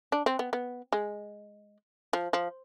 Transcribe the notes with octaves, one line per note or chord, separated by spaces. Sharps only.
D4
C4
B3
B3
G#3
F3
F3